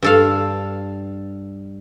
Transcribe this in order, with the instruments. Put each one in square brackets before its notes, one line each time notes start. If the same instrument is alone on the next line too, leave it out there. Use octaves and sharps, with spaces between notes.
[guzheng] G2 A4 F5